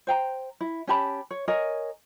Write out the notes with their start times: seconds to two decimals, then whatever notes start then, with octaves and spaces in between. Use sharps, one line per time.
0.07 C5 G5 A#5
0.61 E4
0.87 C#4 G4 A5 B5
1.31 C#5
1.48 A#4 C#5 D#5 G#5